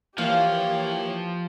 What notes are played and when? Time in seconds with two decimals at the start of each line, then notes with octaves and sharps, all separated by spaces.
0.18 E3 F3 A#3 G4 C#5 F5